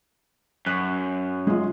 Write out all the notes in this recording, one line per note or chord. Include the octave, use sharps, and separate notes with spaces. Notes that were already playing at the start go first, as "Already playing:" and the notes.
F#2 F#6
G#3 F4